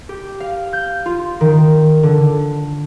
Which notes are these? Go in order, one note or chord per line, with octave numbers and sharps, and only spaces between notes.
G4
F5
G6
F4
D#3
D3